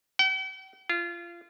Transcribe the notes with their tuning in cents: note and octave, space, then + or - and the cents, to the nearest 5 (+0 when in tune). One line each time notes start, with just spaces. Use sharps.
G5 -45
F4 -25